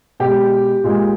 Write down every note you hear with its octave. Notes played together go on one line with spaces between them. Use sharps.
B2 G#3 G4
A#2 G#3